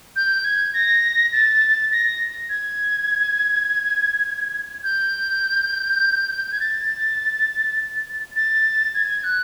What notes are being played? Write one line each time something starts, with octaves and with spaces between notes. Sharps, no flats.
G6
G#6
A#6
A6
A#6
G#6
G6
G#6
A6
A6
G#6
F#6